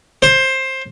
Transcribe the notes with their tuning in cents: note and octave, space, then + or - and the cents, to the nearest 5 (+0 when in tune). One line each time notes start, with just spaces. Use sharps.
C5 +15